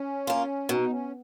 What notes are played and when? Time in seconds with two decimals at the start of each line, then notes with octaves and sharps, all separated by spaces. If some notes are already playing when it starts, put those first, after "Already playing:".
Already playing: C#4
0.27 A#3 F4
0.69 B2 D#4
0.90 C#4